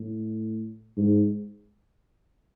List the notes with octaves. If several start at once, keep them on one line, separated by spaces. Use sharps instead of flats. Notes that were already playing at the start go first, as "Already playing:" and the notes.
Already playing: A2
G#2